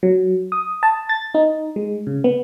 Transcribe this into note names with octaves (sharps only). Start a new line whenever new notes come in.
F#3
D#6
A5
A6
D#4
G#3
C#3
B3